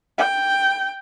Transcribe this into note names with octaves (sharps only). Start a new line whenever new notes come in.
G5